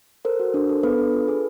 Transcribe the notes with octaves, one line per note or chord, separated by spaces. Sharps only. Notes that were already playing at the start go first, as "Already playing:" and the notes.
A4 A#4 C5
F#4
D4
A4
B3 A4 B4
D4
F4
G#4